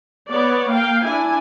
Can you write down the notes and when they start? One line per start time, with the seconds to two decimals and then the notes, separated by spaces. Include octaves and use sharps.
0.30 B3 C#5 D5
0.71 A#3 F5 G5
1.04 D4 E4 G#5